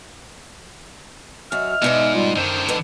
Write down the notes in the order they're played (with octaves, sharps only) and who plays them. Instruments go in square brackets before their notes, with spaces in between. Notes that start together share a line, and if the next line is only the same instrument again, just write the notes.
[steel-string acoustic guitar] F#2 F#4 [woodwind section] D#5 E5 F6
[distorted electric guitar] G#2 [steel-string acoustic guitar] B2 D#4 D5
[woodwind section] G3 F4
[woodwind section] F#2 C5 [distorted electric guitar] D3 D#3
[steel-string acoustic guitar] G#2 A4 B4